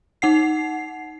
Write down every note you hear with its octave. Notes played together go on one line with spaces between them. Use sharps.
D#4 F#5 C7